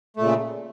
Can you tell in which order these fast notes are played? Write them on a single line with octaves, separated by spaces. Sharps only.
A3 A#2 C#3